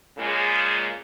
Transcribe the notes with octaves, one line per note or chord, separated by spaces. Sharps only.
A#2 C#3 G#3